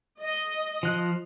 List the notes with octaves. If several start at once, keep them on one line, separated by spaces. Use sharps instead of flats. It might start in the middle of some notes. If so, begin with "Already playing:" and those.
D#5
F3 F#6